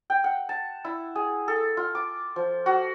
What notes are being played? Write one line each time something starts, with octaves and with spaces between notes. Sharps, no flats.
G5
F#5
A5
E4
G#4
A4
F4
D6
F3
F#4